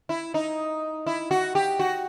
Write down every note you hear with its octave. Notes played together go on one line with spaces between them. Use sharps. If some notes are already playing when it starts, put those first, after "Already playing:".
E4
D#4
E4
F#4
G4
F#4